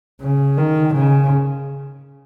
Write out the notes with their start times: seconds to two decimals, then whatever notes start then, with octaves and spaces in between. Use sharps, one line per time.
0.21 C#3
0.58 D#3
0.95 C#3